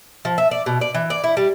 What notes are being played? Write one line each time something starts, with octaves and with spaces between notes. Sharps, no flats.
F3
E5
D5
B2
D5
E3
D5
E4
G3